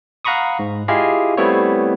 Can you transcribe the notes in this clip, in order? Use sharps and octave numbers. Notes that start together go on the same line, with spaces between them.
F5 F#5 A#5 B5 C#6 D#6
G#2
E4 F4 G4 G#4 D#5 F5
G3 A3 B3 C4 E4 C#5